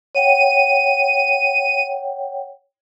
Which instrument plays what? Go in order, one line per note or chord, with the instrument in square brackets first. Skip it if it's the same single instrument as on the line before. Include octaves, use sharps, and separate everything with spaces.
[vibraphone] C#5 F#5 G5 [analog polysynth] D#7